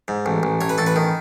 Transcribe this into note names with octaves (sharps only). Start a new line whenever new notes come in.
G#2
A1
A1
A1 C#5
B4
A1 A4
B4
D#3